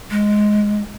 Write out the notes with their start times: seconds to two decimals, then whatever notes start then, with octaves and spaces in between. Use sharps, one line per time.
0.11 G#3